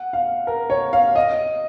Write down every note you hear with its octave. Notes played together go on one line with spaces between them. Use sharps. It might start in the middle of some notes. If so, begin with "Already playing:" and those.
Already playing: F#5
F5
A#4
C#5
F5
D#5